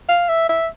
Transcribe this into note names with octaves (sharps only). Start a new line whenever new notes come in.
F5
E5
E5